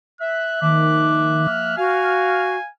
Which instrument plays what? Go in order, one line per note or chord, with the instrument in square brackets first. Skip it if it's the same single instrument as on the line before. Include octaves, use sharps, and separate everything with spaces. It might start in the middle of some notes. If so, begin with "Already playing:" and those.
[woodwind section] E5 [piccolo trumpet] F#6
[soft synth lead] D#3 [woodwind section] F3 A#3 E5 [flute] D6
[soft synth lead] F6
[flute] F#4 [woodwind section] F5 [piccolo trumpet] G#5